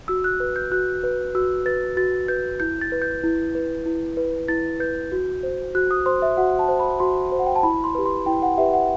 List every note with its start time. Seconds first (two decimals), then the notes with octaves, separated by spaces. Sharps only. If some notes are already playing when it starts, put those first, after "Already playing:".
0.08 F#4 E6
0.24 F#6
0.40 B4
0.56 G6
0.71 F#4 F#6
1.04 B4
1.35 F#4 E6
1.66 B4 A6
1.97 F#4 A6
2.28 B4 G6
2.60 E4 G6
2.81 A6
2.92 B4
3.02 G6
3.23 E4
3.55 B4
3.86 E4
4.17 B4
4.48 E4 A6
4.80 B4 G6
5.12 F#4
5.43 C5
5.75 F#4 F#6
5.91 D#6
6.06 C5 C6
6.22 E5
6.37 F#4 F#5
6.59 A5
6.68 C5
6.80 B5
7.00 F#4 C6
7.32 C5
7.39 F#5
7.47 G5
7.56 A5
7.63 E4 B5
7.84 C6
7.95 G4 B4
8.06 C6
8.26 E4 G5
8.42 F#5
8.58 G4 B4 E5
8.73 F#5